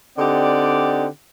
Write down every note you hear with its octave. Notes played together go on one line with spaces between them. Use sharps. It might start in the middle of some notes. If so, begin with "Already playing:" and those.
D3 C4 D#4 G4 D5 F#5